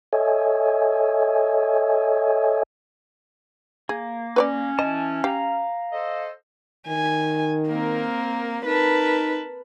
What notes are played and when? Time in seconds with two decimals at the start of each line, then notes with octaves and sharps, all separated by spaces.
0.13 A4 C#5 D#5 E5 G#5
3.89 A#3 G#4
4.36 C#4 B4 C#5 D5
4.79 E3 D#5 A5
5.24 G4 F5 A#5
5.92 A4 C5 D#5
6.88 D#3 G#5
7.68 A#3 C4 A#4
8.66 D#4 A#4 B4 A5